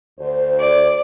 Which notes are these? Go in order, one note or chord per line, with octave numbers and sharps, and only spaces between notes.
D2 C5
D5